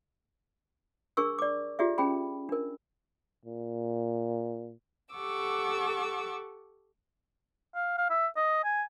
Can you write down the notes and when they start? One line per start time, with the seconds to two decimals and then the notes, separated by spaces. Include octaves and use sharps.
1.17 D4 G#4 A#4 C#6 E6
1.39 D5 D6
1.79 F4 G4 G#4 D5 E5
1.98 C#4 G#4 G5 B5
2.49 D4 A#4
3.45 A#2
5.14 G4 A4 F#5 C#6 D6 E6
7.75 F5
7.98 F5
8.10 E5
8.36 D#5
8.64 G#5